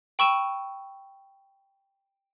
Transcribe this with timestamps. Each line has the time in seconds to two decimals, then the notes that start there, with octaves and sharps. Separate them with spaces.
0.19 G5 B5 C#6 E6 D#7 E7